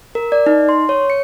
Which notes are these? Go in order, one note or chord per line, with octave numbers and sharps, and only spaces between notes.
A#4
D5
D#4
C6
C#5
C#7